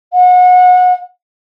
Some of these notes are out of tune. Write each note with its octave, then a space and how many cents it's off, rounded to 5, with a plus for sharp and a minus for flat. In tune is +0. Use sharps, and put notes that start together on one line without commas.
F#5 -30